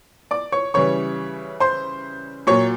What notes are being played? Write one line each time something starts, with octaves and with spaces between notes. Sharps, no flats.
D5 D6
C#5 C#6
C#3 E3 G3 C#5 C#6
C5 C6
A#2 F#3 C#5 C#6